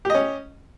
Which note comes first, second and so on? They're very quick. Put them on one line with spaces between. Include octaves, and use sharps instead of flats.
G4 D#5 C#4